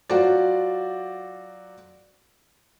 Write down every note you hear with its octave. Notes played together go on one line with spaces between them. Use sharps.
F#3 F4 F#4 C5 D5